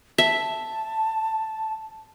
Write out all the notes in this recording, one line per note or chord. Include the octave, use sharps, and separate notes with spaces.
E5 A5